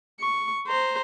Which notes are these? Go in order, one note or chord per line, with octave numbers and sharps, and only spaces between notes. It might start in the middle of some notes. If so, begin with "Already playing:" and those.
C#6
C5 A#5